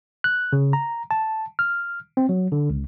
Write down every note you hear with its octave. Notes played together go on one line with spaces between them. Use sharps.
F#6
C#3
A#5
A5
F6
C4
F#3
D3
C#2